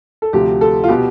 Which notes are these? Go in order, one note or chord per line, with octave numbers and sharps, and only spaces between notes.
A4
D2 C3 F3 G4
A4
F4
B2 B3 G4